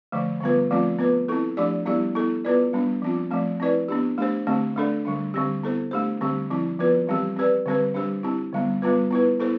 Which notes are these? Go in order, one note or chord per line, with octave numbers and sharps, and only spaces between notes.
D3 F3 A3
D3 G3 B3 F4 B4
F3 A3 C4 F4
B3 F4 B4
C4 E4 A4
F3 A3 D4 G4 D5
G3 B3 E4 G4 D5
B3 E4 A4
B3 F4 B4 D5
G3 B3 D4
F3 C4 F4
F3 A3 C4
C4 E4 B4 D5
B3 D4 G4
A3 D4 G4 C5
D3 A3 C4 G4
A3 D4 A4 D5
D3 G3 D4
D3 G3 C4 G4
B3 E4 A4 C5
A3 D4 G4 C5
D3 G3 C4 G4
F3 C4 E4
F3 B3 F4 B4
E3 G3 C4 G4
C4 G4 B4 D5
D3 G3 C4 G4 B4
G3 D4 G4 C5
C4 E4 G4
D3 G3 B3
G3 B3 F4 B4
B3 E4 B4
B3 E4 A4 C5